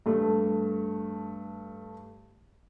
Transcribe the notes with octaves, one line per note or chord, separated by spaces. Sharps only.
G2 A3